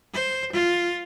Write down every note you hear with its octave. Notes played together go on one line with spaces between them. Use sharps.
C5
F4